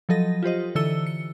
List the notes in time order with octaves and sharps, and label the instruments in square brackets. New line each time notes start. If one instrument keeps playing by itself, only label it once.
[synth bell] F3 F#3 A4 D#5 A#6
F4 G4 C5 D#5
D3 E3 A4 E6 C#7 G7
C#7